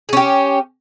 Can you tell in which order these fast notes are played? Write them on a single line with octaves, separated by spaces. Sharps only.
G#4 C#4 G4